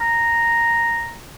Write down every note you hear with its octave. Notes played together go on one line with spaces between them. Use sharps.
A#5